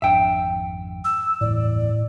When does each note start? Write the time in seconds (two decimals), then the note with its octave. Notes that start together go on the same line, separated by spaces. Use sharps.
0.02 G#1 F2 D4 E5 G5
1.04 E6
1.41 G1 E2 A2 D5